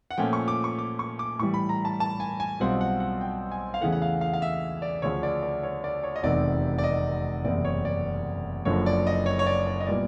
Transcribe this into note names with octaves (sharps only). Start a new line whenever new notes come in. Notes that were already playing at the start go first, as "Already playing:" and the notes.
F#5
A#2 F3 A3 C#4 G5
C#6
D6
C#6
D6
C#6
D6
A2 E3 G3 C#6
B5
A#5
A5
A5
G#5
G#5
B1 B2 G3 C4 F4 F#5
F#5
F#5
G5
G#5
F5
E2 C#3 E3 A3 F#5
F#5
F5
F5
F5
E5
D5
D2 C#3 F3 C#5
D5
D5
C#5
D5
C#5
D#5
F1 E2 C3 D#3 D5
D5
D#5
F#1 E2 C3 D5
C#5
D5
F#1 F#2 D3 F3 C#5
D5
D#5
C#5
C#5
D5
D5
D#5
A#2 G3 B3 E4 D5